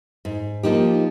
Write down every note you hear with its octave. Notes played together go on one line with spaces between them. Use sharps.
G#2
F3 A#3 D#4 G4